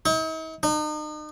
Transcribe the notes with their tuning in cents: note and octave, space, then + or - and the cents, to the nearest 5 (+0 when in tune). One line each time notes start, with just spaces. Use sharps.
D#4 +45
D#4 -40